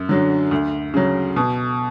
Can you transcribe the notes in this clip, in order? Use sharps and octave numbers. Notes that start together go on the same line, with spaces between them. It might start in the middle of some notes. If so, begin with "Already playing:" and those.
Already playing: F#2
D3 F#3
D2
C#3 F#3
B2